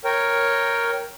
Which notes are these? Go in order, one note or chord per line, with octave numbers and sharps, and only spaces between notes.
A#4 C#5 G5